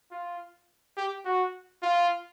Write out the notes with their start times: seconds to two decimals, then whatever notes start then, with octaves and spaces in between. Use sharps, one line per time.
0.11 F4
0.97 G4
1.25 F#4
1.82 F4